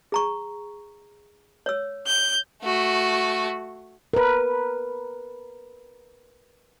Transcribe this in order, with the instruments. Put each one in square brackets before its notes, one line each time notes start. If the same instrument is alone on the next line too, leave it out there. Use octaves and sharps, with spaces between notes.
[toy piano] G#4 A#5 C#6
C#5 E6
[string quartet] G6
[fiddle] A3 F#4
[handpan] A#4 B4